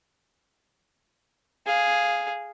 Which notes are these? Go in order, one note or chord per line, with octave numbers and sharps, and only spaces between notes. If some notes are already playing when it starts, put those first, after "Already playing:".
G#4 F5